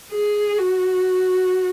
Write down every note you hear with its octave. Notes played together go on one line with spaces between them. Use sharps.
G#4
F#4